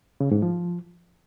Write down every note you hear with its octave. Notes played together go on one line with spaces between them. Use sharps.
C#3
G#2
F3